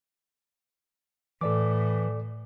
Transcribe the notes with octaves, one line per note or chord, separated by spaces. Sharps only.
A2 E3 A4 D5 D6